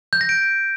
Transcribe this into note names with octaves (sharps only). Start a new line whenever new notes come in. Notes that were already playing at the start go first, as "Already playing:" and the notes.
G6
A#6
D7